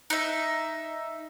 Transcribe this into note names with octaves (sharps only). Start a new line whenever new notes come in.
D#4 E5